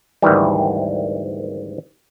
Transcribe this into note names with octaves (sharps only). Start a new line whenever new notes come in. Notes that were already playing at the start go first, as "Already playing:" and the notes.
G#1 D2 D#3 E3 G3